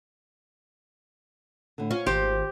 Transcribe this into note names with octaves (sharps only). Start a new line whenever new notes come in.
A2 D3
C#4 F4
G#1 G4 C5